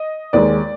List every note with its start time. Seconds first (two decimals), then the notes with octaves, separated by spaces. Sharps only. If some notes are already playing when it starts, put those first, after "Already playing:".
Already playing: D#5
0.33 D#2 D#3 G#3 D5